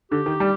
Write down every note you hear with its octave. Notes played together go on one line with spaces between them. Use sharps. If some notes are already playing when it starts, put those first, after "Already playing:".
D3 G4
D#3
G3